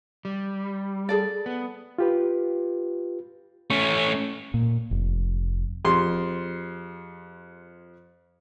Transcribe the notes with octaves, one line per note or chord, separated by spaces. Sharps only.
G3
G#4 A4 D5
B3
F4 G4 B4
A3 C#4 C#6
A#2
F1
F2 G4 G#4 C6